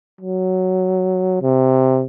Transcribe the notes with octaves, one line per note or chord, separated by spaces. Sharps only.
F#3
C3